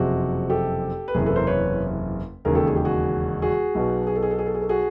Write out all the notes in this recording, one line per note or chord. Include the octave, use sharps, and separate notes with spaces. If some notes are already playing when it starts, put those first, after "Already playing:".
Already playing: F#1 F2 C3 F#4 G#4
G4 A4
B4
F#1 E2 C3 G#4 A#4
A4 B4
A#4 C5
B4 C#5
E1 D#2 C#3 G#4 A#4
G4 A4
G#4
G4
F#4 G#4
F#4 G#4
B1 B2
G#4
A4
G#4
A4
G#4
A4
G#4
A4
F#4 G#4